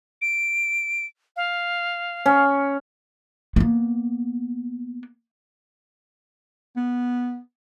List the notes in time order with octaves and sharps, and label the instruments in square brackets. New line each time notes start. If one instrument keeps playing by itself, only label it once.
[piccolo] D7
F5
[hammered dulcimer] C#4
[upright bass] A#3 B3
[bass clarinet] B3